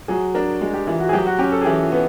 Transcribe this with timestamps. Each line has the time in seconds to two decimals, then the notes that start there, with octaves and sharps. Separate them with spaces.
0.08 F#3 G#4
0.35 D4 A#4
0.61 G#3
0.74 G4
0.87 E3 F4
1.00 F#4
1.09 G#4
1.13 F#3 G4
1.27 F#4
1.39 C#4 G4
1.52 A4
1.62 G#4
1.65 E3 G4
1.83 F4
1.92 B3